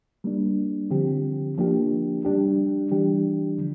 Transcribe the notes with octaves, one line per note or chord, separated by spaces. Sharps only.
G3 A#3 D4
D3 F3 C4 G4
F3 A#3 D4 G4
G3 D4 G4
E3 G3 D4 G4
D3 F3